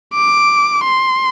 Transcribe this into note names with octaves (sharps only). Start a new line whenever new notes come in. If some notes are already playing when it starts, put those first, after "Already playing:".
D6
C6